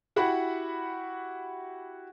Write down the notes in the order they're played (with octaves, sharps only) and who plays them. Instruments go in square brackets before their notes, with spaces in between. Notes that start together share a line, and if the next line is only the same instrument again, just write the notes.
[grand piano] E4 F#4 G4 F#5 B5